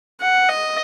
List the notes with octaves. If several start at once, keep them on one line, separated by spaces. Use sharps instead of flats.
F#5
D#5